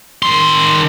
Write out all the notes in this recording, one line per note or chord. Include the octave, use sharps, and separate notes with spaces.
D#3 C6